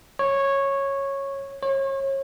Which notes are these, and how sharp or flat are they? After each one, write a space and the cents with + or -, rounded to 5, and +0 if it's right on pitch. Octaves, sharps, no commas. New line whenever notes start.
C#5 -10
C#5 -35